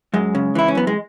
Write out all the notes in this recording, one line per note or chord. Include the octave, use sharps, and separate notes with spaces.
F#2 G#3
C#3
E3 E4
C#4
F#2 B3
G#3